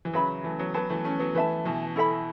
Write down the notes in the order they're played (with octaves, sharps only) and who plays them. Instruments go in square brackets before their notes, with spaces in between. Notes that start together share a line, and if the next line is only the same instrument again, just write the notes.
[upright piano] E3
[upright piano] C#3 F#3 [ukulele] B4 E5 B5
[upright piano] E3 A3
F#3 B3
[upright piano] F#3 B3 [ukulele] B4 A5
[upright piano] E3 A3
A3 C#4
F#3 B3
[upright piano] E3 A3 [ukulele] B4 E5 A5
[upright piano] B2 E3
[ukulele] E4 A4 E5 B5